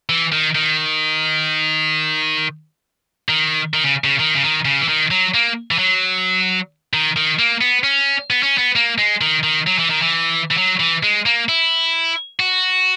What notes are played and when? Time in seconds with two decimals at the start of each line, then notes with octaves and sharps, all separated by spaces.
0.09 E3
0.32 D#3
0.55 D#3
3.29 D#3
3.74 D#3
3.84 C#3
4.04 C#3
4.20 D#3
4.35 C#3
4.43 D#3
4.65 C#3
4.81 E3
4.88 D#3
5.11 F#3
5.34 A#3
5.71 E3
5.79 F#3
6.94 D#3
7.16 D#3
7.39 A#3
7.61 B3
7.84 C#4
8.30 B3
8.43 C#4
8.58 B3
8.76 A#3
8.98 G#3
9.21 D#3
9.44 D#3
9.67 F#3
9.79 E3
9.90 D#3
10.02 E3
10.51 E3
10.58 F#3
10.80 E3
11.03 G#3
11.26 A#3
11.49 E4
12.40 F#4